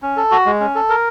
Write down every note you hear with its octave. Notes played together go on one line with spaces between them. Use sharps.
C#4
A4
F#4
G#3
C#4
A4
A#4